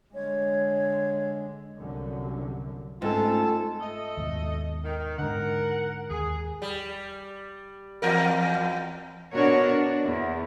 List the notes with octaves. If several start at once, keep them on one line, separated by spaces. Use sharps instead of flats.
D3 G#3 C#5
C2 F#2 D3
G#2 A3 C4 C#4 F4 A4
A3 A4 D#5
D#2 G#2 B2
D#3
G#2 D3 A#4 F#5
D#2 G#4
G3
E2 A#4
B2 D4 F#4 A#4 C#5
D4
E2